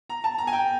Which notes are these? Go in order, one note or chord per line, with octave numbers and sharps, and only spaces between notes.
A#5
A5
A#5
G#5
G5